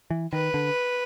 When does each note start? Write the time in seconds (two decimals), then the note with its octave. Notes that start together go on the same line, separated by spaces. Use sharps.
0.10 E3
0.33 D#3 B4
0.54 D3